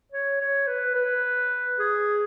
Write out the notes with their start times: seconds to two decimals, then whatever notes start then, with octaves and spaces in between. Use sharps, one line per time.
0.12 C#5
0.41 C#5
0.67 B4
0.95 B4
1.79 G#4